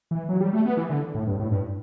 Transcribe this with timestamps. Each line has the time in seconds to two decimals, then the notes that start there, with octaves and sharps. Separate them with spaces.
0.11 E3
0.29 F#3
0.41 G3
0.53 A3
0.66 B3
0.77 E3
0.90 D3
1.15 A2
1.27 G2
1.40 A2
1.52 G2